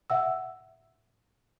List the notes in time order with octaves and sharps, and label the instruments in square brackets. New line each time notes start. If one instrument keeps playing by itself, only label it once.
[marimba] E5 F#5 E6